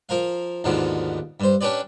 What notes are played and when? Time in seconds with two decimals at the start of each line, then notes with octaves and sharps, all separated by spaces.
0.09 F3 A#4 F5
0.64 D#2 G#2 B2 D3 F3
1.40 G2 C5
1.61 C#4 D4 G4 B4 D5